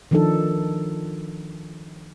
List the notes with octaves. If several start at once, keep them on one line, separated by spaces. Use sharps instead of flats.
D#3 F3 D4 D#4 A4